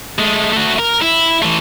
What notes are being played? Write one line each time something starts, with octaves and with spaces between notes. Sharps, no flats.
G#3 A3
A3 F#4
A#4
E4
E3 A3